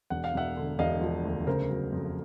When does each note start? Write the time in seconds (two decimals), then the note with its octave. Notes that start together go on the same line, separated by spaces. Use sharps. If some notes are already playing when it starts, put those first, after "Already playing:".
0.10 E1 F#5
0.24 F5
0.34 E1 E5 F#5
0.57 D3
0.79 E1 D#5 F5
1.01 F3
1.25 D2
1.47 C#3 A#4 C5
1.70 F#3
1.92 F2